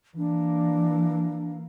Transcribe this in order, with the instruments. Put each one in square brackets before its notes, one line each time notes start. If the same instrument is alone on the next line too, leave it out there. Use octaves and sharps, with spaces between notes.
[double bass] E3 A#3 [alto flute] D4